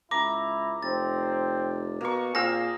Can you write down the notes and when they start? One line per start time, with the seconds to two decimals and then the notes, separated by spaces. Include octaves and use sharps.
0.11 C#2 E4 A#5 D6
0.83 F1 C4 A6
2.01 B2 A#3 C#6
2.35 A#2 C4 G#4 F5 E6 A#6